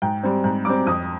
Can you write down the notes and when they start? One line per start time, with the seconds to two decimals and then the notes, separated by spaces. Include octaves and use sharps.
0.02 G#2 G5
0.23 G3 C4
0.44 G#2
0.65 G3 C4 D6
0.86 F2 D#6